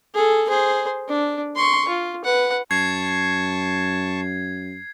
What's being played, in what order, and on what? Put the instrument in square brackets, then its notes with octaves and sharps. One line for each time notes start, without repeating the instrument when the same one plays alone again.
[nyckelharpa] G#4 A4
G#4 C5
D4
C6 C#6
F4
B4 F#5
[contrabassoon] F#2 [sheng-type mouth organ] A5 C#6 [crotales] G#6 C7